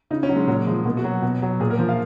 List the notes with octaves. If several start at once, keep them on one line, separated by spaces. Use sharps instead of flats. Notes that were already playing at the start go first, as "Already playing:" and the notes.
C#3 D#4
C#4
F#3
G#3
A#2 F#3
F3 G#3
B2 A#3
F#4
F#3
B2
F#3
A#2 G#4
A#4
F3
F5